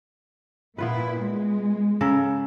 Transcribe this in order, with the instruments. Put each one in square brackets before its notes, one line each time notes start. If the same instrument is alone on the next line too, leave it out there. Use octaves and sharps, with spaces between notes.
[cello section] A#2 E4 [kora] B3 F4 B4
[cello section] G#3
[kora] C#3 A4 A#4